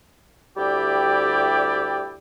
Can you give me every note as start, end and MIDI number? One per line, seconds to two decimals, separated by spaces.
0.57 2.15 38
0.57 2.15 55
0.57 2.15 64
0.57 2.15 67
0.57 2.15 74
0.57 2.15 79